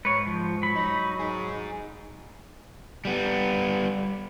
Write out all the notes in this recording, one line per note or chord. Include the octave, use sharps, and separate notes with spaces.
G#2 B4 C#5
F3
F#3 B5
D#4
D#4 G#4
G3 B3